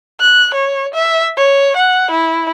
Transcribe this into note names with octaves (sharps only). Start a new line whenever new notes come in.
F#6
C#5
E5
C#5
F#5
E4